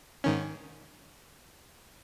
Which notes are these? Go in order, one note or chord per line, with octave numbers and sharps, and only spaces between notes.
G#2 D#3 C#4